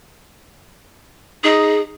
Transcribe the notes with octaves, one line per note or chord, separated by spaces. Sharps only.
D#4 G#4